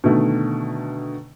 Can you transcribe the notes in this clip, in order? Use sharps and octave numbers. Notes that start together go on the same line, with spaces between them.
B2 D3 D#3 A3